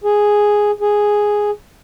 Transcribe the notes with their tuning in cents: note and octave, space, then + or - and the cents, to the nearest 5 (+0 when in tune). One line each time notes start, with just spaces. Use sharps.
G#4 +0
G#4 +0